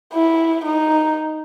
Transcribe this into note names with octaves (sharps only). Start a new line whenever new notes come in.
E4
D#4